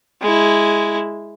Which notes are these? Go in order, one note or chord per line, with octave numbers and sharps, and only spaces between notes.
G#3 E4